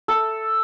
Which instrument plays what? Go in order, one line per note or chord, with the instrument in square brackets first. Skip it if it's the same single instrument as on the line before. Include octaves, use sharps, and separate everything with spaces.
[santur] A4